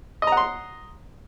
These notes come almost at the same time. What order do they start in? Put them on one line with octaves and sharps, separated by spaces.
D#5 A#5 F#5 C6